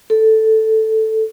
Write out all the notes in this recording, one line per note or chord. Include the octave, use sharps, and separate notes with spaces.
A4